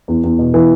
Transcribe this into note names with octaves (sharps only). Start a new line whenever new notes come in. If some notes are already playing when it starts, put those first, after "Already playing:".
E2
E2
B2
E3